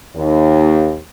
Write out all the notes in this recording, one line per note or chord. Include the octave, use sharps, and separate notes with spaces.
D#2